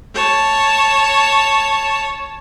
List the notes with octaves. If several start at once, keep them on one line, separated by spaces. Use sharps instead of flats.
C#5 A5